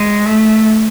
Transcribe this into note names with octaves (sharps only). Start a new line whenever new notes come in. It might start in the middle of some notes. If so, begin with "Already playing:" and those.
Already playing: G#3
A3